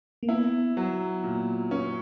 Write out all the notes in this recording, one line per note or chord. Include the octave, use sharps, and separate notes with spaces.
A#3
B3 E4
F#3
A#2
C#4